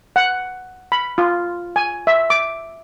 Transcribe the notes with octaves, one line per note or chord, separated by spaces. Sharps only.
F#5
B5
F4
G#5
E5
D6